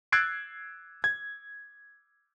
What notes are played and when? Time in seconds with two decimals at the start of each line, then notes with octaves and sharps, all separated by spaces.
0.12 E6 F#6 G#6 A6 C7 D7
1.04 G#6